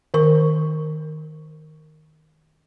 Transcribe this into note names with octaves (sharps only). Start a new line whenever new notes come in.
D#3 A#4 C#6